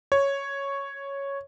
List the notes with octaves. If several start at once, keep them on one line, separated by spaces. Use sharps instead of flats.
C#5